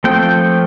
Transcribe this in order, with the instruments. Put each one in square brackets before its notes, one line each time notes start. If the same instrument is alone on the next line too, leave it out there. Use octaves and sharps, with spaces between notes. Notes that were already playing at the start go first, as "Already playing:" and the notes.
[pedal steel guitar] F3 A3 C4 G5